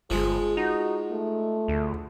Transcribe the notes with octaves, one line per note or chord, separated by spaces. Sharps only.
G1 F3 G#3 G#4
D#4 F#4
A3
D2